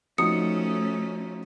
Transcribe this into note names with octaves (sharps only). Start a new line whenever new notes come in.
F3 A3 C#4 D#4 F#4 D#6 C#7